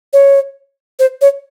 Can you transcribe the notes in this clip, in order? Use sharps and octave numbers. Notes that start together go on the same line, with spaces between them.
C#5
C5
C#5